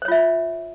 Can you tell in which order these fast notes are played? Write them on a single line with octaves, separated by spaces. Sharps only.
C5 C#5 F4 E5